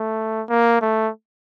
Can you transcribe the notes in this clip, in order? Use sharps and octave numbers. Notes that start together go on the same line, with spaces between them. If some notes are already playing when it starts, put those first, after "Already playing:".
Already playing: A3
A#3
A3